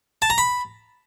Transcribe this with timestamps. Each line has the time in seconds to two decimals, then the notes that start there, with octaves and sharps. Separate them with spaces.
0.22 A5
0.30 A#5
0.38 B5